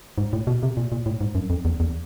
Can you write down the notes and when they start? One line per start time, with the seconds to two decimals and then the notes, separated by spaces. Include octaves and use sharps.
0.18 G#2
0.33 A2
0.47 B2
0.63 C3
0.77 A#2
0.92 A#2
1.06 A2
1.21 G#2
1.35 F#2
1.50 F2
1.65 E2
1.80 E2